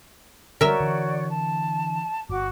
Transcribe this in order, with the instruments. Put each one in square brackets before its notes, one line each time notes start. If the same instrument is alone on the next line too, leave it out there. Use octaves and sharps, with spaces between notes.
[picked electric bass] D3 F#3 G3 [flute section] F#4 C#5 D5 [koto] A#4 E5
[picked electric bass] D3 E3
[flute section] A5
[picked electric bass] G1 [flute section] F#4 D6